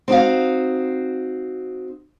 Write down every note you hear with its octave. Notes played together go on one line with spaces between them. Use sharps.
C4 D#4 F#4 F5